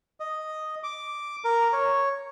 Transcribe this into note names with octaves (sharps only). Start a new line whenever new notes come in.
D#5
D6
A#4
C#5